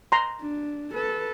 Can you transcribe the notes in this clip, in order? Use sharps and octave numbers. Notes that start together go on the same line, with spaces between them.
A#5 C6
D4
A4 B4